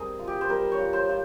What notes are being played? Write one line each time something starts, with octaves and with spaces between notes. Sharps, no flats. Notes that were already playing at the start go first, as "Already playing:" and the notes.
Already playing: G3 C4 G#4 A#4
F4
G4
C5
G3 A#4
C#5
F4
C5
F4